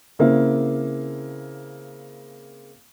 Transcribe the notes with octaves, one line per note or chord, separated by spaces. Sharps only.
C#3 A#3 C4 E4